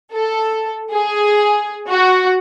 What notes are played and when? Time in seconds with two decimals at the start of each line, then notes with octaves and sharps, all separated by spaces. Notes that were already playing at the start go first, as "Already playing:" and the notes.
0.12 A4
0.92 G#4
1.89 F#4